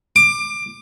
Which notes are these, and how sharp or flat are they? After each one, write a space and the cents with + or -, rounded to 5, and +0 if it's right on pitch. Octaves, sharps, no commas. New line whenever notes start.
D6 +20